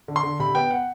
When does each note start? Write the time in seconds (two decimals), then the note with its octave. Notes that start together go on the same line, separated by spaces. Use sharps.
0.08 D3
0.16 C6
0.23 D3
0.39 C3 B5
0.55 B3 G5
0.71 F#5